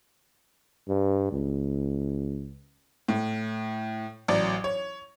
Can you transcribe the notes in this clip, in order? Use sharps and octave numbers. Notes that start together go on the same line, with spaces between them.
G2
C#2
A2
A1 F#3 D5
C#5